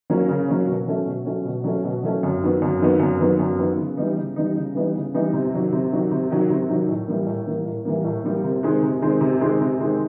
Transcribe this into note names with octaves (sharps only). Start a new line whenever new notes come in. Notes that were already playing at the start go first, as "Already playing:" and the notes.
F#3 A#3 C#4
C#3
F#3 A#3 C#4
B2
F#3 A3 C#4
B2
F#3 A3 C#4
B2
F#3 A3 C#4
B2
F#3 A3 C#4
F#2
D#3 F#3 B3
F#2
D#3 F#3 B3
F#2
D#3 F#3 B3
F#2
D#3 F#3 B3
C#3
E3 G3 B3 D#4
C#3
E3 G3 B3 D#4
C#3
E3 G3 B3 D#4
C#3
E3 G3 B3 D#4
C3
D#3 F#3
C3
D#3 F#3
C3
D#3 F#3
C3
D#3 F#3
A2
E3 G3 A#3
A2
E3 G3 A#3
A2
E3 G3 A#3
A2
E3 G3 A#3
C3
D#3 G#3 C4
C3
D#3 G#3 C4
C3
D#3 G#3 C4
C3
D#3 G#3 C4